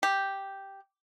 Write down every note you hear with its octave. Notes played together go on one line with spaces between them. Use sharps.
G4